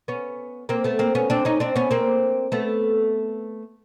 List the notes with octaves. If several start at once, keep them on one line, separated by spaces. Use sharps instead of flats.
B3 C#4
A#3 C4
A3 B3
A#3 C4
B3 C#4
C4 D4
C#4 D#4
C4 D4
B3 C#4
A#3 C4
A3 B3